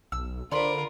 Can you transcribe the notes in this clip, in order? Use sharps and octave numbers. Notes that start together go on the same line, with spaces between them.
B1 E6
D3 F4 A#4 C5 D5 B5 C6